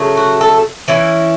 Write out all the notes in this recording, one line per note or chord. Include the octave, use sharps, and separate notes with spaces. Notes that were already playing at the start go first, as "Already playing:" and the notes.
Already playing: C#3 F#3 A3
F#4
A4
E3 C#4 E4